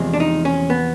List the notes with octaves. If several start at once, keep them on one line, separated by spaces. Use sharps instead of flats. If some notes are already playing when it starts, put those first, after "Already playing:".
Already playing: E2 C3 F3 G#3
D4
D#4
C#4
B3